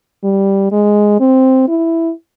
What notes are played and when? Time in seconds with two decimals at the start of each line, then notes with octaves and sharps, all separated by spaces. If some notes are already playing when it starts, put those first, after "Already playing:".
0.24 G3
0.72 G#3
1.20 C4
1.68 E4